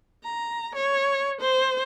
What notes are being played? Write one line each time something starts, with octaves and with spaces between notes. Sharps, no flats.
A#5
C#5
C5